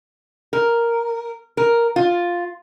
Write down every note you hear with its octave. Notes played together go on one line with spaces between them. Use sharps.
A#4
A#4
F4